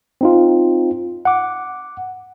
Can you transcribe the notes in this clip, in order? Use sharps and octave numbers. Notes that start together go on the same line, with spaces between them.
C4 D#4 F4
F#5 D6